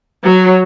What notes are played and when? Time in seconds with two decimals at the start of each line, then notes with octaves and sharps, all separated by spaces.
0.25 F#3